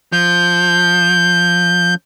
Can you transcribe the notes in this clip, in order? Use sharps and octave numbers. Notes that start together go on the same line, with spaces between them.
F3 G6